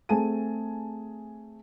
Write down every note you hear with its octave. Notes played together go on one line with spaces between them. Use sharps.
A3 C4 G#4 G#5 A5 D#7